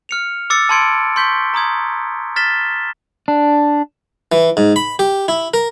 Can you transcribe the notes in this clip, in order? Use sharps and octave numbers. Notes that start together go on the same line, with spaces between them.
F6 C#7 F7
D6 E6 A6 C#7
A5 B5 C6 G#6 C#7 D7
C6 C#6 G6 B6 G7
A#5 C6 D#6 G#6
F6 A6 B6 E7 G7
D4
E3
G#2
B5
G4
E4
A#4